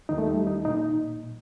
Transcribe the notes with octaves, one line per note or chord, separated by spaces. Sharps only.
D#2 D#3 D#4
A3
G3
D#4
A#2 D#4